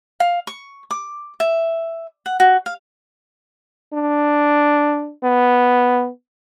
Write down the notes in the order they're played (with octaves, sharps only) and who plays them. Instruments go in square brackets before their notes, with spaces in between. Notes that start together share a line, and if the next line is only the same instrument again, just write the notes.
[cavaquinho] F5
C#6
D6
E5
F#5
F#4
F5
[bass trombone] D4
B3